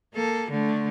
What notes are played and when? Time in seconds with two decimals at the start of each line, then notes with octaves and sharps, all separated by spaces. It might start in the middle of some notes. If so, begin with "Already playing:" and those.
0.14 A#3 A4
0.50 D3 A3